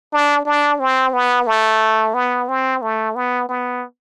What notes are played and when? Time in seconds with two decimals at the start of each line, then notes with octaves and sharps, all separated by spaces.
0.13 D4
0.45 D4
0.80 C4
1.13 B3
1.47 A3
2.14 B3
2.48 C4
2.82 A3
3.15 B3
3.49 B3